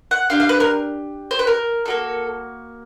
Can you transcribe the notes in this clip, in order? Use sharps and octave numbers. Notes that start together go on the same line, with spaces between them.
F#5
D4 G4 F5
F5
B4
A#4
C5
B4
A#4
A#3 D4 F#4 A4